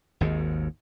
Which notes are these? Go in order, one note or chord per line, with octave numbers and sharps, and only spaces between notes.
G#1 D#2 G#2